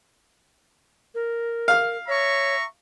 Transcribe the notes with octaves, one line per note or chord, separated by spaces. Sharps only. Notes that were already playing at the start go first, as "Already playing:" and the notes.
A#4
F5 F6
C#5 E5 A#5 C#6